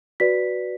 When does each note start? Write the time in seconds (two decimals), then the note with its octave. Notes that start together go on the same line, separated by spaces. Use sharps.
0.20 F#4 B4 D5 B6